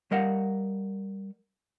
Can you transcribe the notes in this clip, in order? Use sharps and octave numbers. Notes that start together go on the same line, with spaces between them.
G3 A#4 D#5 F5 F#5